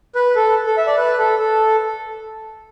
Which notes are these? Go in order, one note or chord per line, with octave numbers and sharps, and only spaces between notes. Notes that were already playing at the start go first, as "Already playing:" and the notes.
B4
A4
A4
E5
D5
B4
A4
A4